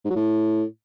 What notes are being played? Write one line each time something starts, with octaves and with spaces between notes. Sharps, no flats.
G#2
F#3
A2